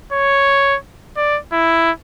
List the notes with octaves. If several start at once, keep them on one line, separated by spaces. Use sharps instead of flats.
C#5
D5
E4